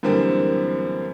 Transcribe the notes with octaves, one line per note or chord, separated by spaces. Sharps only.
F#2 D3 E3 G3 A#3 C4